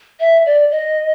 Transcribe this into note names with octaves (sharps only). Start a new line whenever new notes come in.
E5
D5
D#5